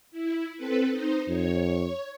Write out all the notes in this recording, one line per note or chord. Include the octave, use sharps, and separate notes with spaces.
E4
C4 A4 B4
D#4 C5
F2 C#5